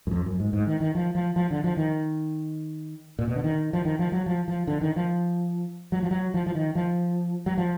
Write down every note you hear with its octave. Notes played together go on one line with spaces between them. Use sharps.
F#2
F2
F#2
G#2
G#2
D#3
D#3
F3
F3
F3
D3
F3
D#3
A#2
B2
D3
D#3
F3
D#3
F3
F#3
F3
F3
D3
D#3
F3
F#3
F3
F#3
F3
F3
D#3
F3
F#3
F3